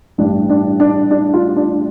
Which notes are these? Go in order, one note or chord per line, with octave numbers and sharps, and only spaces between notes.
A1 G2 G3 D4
D4
D4
D4
F4
D4